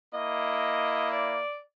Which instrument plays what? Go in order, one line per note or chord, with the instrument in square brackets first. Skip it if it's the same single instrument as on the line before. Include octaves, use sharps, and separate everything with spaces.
[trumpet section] A#3 E4 [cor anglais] D#5
[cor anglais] D5